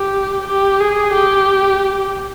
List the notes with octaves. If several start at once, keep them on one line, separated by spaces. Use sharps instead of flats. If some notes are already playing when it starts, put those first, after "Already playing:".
Already playing: G4
G4
G#4
G4